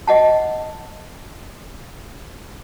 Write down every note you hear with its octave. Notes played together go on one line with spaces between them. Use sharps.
D#5 F#5 A5